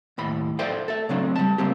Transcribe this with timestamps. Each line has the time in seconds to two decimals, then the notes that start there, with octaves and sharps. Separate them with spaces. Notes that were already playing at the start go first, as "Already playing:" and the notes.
0.18 D#2 A2 B5
0.59 A4 C5 D5 E5 G5
0.88 A4 E5
1.09 C#3 F#3 A3 C4 D4
1.36 G3 A5
1.58 C#3 A3 A#3 C4 G4